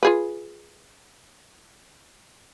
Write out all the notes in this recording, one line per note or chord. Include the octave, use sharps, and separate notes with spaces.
F4 G#4 B4